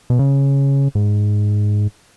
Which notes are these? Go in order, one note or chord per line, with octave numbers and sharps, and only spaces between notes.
B2
C#3
G#2